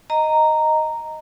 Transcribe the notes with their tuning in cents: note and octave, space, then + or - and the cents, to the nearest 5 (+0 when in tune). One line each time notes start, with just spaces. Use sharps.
D#5 +0 A#5 -10